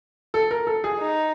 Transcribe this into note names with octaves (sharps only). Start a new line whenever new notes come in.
A4
A#4
A4
G#4
D#4